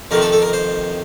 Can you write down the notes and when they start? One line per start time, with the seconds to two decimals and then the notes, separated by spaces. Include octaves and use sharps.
0.11 F2 C3 D#3 A#4
0.22 A4
0.32 A4
0.42 A#4
0.53 C5